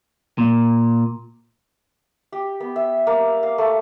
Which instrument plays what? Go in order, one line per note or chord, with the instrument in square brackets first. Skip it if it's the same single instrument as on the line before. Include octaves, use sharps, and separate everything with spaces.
[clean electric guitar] A#2
[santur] G4
B3
E5
A#3
F5
A3